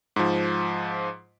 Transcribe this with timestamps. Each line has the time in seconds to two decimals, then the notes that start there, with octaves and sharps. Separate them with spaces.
0.16 G#2 F3